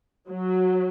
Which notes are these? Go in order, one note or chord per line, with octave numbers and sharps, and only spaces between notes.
F#3